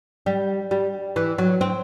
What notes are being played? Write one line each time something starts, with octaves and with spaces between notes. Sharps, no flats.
G3
G3
E3
F#3
C4